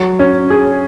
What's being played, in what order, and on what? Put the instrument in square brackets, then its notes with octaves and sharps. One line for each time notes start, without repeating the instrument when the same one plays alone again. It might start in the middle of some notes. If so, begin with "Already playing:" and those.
Already playing: [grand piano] F#3
C#4
G#4